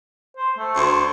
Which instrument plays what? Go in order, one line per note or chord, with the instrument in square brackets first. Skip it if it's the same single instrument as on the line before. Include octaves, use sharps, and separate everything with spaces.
[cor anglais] C5
A3
[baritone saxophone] D2 [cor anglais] C5